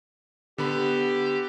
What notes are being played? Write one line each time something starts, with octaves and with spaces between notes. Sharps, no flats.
D3 B3 G4 B5